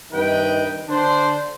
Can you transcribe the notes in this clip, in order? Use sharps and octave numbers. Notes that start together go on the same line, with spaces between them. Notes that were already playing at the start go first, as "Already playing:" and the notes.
G2 C3 D#3 B4 D#5 G5
D3 D4 C5